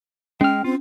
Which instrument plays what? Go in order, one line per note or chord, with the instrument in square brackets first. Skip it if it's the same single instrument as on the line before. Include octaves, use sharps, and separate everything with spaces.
[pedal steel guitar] G#3 F6 [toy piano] C#4 [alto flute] G5
[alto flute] C4 [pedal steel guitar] F4